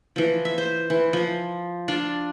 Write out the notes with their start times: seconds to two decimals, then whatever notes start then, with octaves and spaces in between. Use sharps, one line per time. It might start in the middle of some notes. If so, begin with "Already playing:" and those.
0.16 E3 F3
0.45 E5
0.58 C5
0.90 E3
1.13 F3
1.88 D4 F4